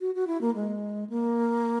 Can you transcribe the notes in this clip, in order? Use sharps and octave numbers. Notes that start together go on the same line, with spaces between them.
F#4
F#4
E4
A#3
G#3
A#3